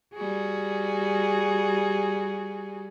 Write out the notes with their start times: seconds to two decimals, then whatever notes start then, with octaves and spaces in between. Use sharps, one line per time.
0.14 G3 F#4 G#4